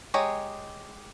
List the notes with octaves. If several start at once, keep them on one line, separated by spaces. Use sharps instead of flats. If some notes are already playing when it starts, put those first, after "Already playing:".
G#3 G4 C#5 D#5 A#5